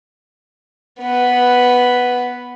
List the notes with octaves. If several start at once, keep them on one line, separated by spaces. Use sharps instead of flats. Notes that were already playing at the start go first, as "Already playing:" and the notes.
B3 B4